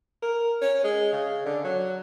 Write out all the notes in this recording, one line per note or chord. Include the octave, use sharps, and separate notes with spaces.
A#4
C#4
G#3
C#3
D3
F#3